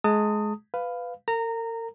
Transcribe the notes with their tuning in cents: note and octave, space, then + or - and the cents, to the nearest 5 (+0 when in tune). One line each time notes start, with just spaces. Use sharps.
G#3 +25 A5 +40 D#6 +0
B4 +15 F5 +0
A#4 -40 A#5 -20